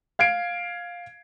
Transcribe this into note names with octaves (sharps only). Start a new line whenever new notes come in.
F5 G#6 C7 D7